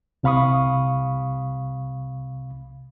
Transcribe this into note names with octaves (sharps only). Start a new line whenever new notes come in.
C2 C3 F5 B5 C#6 D#6